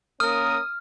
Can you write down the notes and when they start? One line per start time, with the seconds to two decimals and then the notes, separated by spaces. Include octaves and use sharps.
0.20 A#3 C#4 A#4 D#6 F6